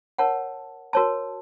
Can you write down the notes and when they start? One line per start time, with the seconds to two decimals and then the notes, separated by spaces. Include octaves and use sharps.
0.19 A#4 C#5 F#5 A5
0.93 F#4 A#4 C#5 A5